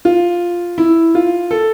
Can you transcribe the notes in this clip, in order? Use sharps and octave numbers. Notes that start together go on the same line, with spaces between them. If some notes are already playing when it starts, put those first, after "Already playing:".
F4
E4
F4
A4